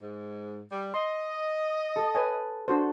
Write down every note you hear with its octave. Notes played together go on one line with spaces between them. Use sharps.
G#2
G3
D#5 C6
A4 D#6
B4 C#5 G#5
D4 F#4 A4 C5